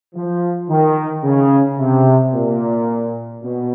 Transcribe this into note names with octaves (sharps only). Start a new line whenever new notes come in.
F3
D#3
C#3
C3
A#2
B2